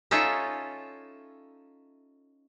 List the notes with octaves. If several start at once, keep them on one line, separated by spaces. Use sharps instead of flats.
C#4 D#4 F4 A4 C#5 E5